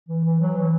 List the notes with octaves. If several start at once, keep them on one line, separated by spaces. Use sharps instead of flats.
E3
E3
F#3
E3